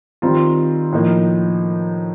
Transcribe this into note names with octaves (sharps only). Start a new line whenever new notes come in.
D#3 G3 C4 F4
A2 F3 A#3 D#4